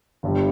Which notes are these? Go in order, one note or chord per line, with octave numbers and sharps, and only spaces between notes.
G1 G2 G3